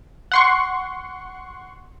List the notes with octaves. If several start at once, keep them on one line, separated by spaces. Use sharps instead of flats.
F#5 C6 C#6